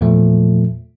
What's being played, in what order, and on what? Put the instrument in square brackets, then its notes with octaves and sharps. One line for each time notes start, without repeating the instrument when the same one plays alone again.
[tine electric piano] E2 A#2 F3 A3